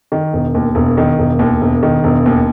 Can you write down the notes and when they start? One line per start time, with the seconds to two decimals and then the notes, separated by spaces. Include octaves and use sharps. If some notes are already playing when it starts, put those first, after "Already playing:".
0.12 D#3
0.33 E1
0.55 D#2
0.75 E1
0.97 D#3
1.19 E1
1.39 D#2
1.61 E1
1.83 D#3
2.04 E1
2.26 D#2